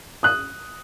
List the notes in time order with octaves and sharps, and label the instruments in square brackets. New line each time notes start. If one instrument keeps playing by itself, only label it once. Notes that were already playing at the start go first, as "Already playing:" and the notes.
[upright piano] D#6 F#6